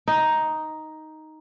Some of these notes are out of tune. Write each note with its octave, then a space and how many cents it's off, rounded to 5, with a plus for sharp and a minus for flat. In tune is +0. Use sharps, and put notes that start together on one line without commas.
D#4 +5